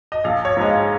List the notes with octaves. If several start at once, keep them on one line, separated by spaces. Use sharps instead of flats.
D#5
A#1 F5
C#5
G#2 F3 G#3 D#5
F5